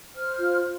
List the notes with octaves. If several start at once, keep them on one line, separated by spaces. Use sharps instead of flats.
C5 F6
F4